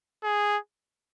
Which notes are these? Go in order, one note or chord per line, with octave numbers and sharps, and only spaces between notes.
G#4